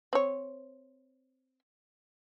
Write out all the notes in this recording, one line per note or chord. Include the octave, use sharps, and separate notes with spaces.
C4 C#5